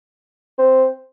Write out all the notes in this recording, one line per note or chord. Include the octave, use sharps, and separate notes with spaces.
C4